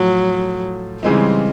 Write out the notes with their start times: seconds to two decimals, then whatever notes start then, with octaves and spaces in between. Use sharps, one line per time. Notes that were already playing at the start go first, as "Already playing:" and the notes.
Already playing: A2 F3 F#3 A3
1.03 C#3 E3 G3 G#3 C4 D#4